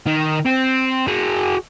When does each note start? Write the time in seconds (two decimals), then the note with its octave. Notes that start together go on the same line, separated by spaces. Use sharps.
0.07 D#3
0.45 C4
1.07 F#4 G#4